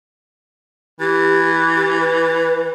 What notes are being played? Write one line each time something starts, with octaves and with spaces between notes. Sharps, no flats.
E3 G4
G4
B4